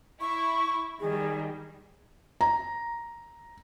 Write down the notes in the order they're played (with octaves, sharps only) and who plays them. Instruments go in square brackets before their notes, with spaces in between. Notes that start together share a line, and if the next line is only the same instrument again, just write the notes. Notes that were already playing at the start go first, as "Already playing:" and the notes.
[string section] E4 [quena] C#6
[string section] D#3 G3 [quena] G#4
[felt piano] A#5